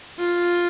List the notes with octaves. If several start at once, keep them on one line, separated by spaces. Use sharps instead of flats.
F4